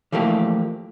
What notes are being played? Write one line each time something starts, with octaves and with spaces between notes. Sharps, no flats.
E3 F3 A3 A#3 G4